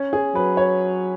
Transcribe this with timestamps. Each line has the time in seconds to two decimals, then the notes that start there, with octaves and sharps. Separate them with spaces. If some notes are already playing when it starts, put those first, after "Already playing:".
Already playing: C#4
0.13 G#4
0.35 F#3 B4
0.57 C#5